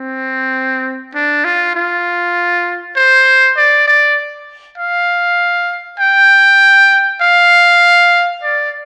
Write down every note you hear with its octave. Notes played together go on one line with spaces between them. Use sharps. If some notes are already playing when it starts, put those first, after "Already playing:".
Already playing: C4
D4
F4
F4
C5
D5
D5
F5
G5
F5
D5